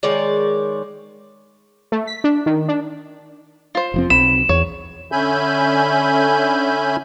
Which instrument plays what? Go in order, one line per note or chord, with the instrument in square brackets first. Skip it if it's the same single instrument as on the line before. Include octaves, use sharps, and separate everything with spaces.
[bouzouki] D#3 G#3 C#5 D5
[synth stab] A3
B6
D4
D#3
D4
[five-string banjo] F4 C5
[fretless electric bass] F1 F3 C4
[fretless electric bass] B1 C4 [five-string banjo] B5 [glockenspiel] E7
[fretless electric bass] E2 [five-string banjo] C#5
[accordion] D3 C#4 E5 G#5 B5 G6